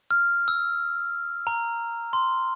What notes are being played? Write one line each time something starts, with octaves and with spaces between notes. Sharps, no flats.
F6
E6
A#5
C6